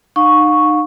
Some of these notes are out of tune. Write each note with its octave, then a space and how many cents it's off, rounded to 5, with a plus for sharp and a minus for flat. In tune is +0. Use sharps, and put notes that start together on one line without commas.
D#4 -30 F5 +45 C#6 +0